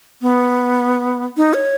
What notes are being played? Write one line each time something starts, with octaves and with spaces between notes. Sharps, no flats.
B3
D#4
C#5